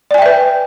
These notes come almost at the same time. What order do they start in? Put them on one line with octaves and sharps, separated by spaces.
D5 G#5 G5 E5 B4